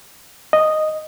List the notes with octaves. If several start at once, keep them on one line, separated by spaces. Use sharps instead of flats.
D#5